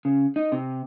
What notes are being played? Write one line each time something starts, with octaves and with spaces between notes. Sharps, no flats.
C#3
D#4
C3